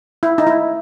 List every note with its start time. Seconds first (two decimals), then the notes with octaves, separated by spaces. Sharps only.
0.23 E4
0.38 D#4
0.47 E4